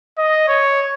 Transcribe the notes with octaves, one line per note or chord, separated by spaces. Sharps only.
D#5
C#5